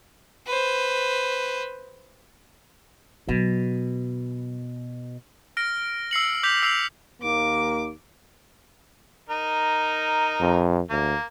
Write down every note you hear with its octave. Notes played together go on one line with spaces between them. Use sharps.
B4 C5
B2 F#3
F6 A#6 D7
E6 C7 C#7 F#7
D6 G6 B6 F7
E6 C7 F7 F#7
D#2 A#3 D6
D#4 A#4
F2
D2 A#3